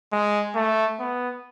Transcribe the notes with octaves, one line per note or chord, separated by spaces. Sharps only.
G#3
A3
B3